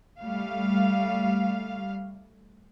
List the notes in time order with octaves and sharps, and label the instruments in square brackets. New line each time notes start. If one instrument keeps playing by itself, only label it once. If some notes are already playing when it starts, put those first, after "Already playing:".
[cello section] G3 A3 F5